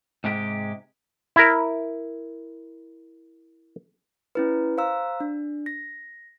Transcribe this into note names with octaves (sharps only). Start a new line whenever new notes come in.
G#2 C3 G#3 G4
E4 A#4
C#4 E4 B4
C5 F5 A#5 E6
D4
A#6